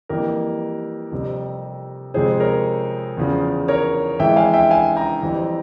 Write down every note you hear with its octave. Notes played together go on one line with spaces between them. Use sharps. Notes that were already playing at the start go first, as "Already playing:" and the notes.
F2 E3 G3 A#3 G4 A#4
F2 C3 G3 C4
F2 C3 F3 G#3 G#4 C5
A#4 C#5
E2 C#3 F3
A#4 C#5
F2 E3 G#3 E5 G5
F5 G#5
E5 G5
F5 G#5
G5 A#5
F2 E3 G3 C4